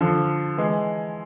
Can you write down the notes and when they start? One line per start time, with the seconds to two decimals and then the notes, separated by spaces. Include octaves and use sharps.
0.01 D3 F3
0.58 E3 G#3